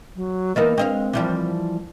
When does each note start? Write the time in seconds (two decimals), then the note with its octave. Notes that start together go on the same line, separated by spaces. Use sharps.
0.16 F#3
0.56 E3 A#3 B3 D#4 A#4 D#5
0.78 G#3 C4 D4 B4 D#5 F5
1.13 E3 F3 G3